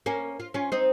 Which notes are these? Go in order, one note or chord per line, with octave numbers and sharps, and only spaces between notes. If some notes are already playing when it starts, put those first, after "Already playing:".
A#3 C#4
F4
C#4 F4
C4 D#4